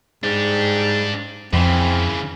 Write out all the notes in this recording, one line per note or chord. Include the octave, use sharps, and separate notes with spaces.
G#2 D4 G4
F2 C#3 E3 C4